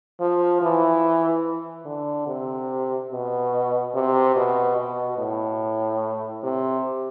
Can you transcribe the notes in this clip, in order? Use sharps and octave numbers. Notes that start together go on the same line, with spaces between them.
F3
E3
D3
C3
B2
C3
B2
B2
A2
C3